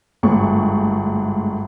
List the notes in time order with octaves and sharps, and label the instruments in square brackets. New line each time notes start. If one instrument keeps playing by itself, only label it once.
[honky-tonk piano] G1 D2 G#2 C#6